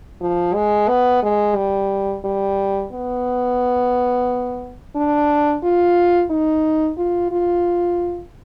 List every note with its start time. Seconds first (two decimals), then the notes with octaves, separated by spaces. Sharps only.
0.21 F3
0.54 G#3
0.88 B3
1.23 G#3
1.56 G3
2.25 G3
2.93 B3
4.96 D4
5.63 F4
6.30 D#4
6.98 F4
7.31 F4